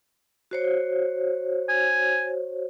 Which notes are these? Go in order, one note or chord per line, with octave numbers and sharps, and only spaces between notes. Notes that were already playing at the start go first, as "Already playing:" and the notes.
F#4 C5 C#5
G#5